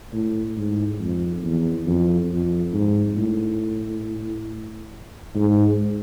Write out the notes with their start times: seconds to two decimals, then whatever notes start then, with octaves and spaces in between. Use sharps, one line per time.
0.13 A2
0.57 G#2
1.00 F2
1.44 E2
1.87 F2
2.31 F2
2.74 G#2
3.17 A2
5.35 G#2